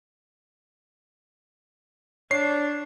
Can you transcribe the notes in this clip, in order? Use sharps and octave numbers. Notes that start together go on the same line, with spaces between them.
D4 C#5 C7